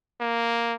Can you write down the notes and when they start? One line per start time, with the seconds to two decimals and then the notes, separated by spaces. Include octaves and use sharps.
0.20 A#3